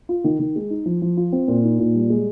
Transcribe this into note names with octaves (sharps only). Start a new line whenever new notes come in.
F4
D#3
D#3
G#3
D#4
F3
F3
F4
C4
A#2
D#4
A#2
G3
G#3